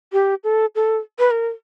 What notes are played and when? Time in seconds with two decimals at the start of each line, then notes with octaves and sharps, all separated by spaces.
0.12 G4
0.44 A4
0.75 A4
1.19 B4
1.31 A#4